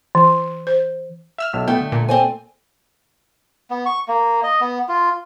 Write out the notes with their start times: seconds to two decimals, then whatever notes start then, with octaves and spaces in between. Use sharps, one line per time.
0.15 E3
0.67 C5
1.38 E5 E6 F6
1.53 B1
1.68 A3 B3 G5
1.80 D3
1.92 A#2
2.09 A3 C4 D5 G#5
3.70 B3
3.86 C#6
4.08 A#3
4.43 D#5
4.61 B3
4.89 F4